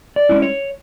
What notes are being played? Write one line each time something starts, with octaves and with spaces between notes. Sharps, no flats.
D5
G#3 C#4 E4
C#5